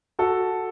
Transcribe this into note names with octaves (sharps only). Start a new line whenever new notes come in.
F#4 A4